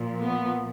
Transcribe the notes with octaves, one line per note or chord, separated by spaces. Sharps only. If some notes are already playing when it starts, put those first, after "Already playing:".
Already playing: A#2 F3
B3